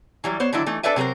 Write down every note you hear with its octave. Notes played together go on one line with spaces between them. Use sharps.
E3 F#3 G3
B3 C5 C#5
D3 D#3 F#3 D4 E4
E3 A3 D#4
D4 A4 B4 D5 E5 G#5
C3 F#3 G#4 A#4 C5